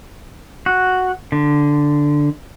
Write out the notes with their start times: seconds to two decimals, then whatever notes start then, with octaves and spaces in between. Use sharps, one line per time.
0.66 F#4
1.32 D3